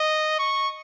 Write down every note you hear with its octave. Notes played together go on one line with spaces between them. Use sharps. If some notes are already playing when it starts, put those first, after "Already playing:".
Already playing: D#5
C#6